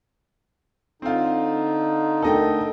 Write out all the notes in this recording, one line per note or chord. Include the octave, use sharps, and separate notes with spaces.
D3 C4 D#4 F4
A3 D4 A4 A#4 D#5 G5